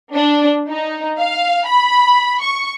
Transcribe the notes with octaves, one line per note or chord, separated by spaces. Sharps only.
D4
D#4
F5
B5
C#6